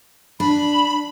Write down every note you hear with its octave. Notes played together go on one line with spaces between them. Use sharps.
D4 B5